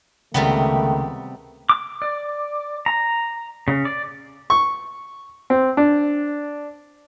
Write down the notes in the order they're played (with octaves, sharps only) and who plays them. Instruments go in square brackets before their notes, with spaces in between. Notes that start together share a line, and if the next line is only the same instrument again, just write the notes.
[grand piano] C#2 [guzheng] C3 G3 B3 [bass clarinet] D#3 [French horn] A3
[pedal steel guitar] D6
D5
A#5
C#3
D5
[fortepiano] C#6
C4
D4